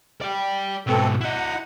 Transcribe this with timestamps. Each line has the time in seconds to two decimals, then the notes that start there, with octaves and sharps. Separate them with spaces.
0.21 D5 G5
0.87 G#2 B2 E3 C4 A4
1.21 E4 D#5 F#5